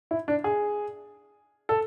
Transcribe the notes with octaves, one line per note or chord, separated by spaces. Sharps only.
E4
D4
G#4
A4